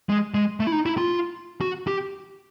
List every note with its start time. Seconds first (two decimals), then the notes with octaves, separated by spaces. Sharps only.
0.09 G#3
0.34 G#3
0.60 A3
0.67 E4
0.72 D#4
0.86 E4
0.98 F4
1.61 F#4
1.87 G4